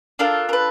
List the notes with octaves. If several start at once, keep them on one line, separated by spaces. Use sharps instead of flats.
D4 F4 A4 A#4
A#4
B4